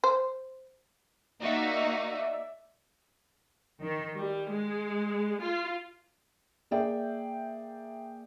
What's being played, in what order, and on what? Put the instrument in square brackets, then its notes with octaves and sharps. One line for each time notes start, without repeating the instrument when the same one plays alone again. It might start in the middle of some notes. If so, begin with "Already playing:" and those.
[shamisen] C5
[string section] A#3 D#4 F#4 [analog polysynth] D5 E5
[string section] D#3
G3
G#3
F4
[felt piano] A#3 G#4 D5 E5 G5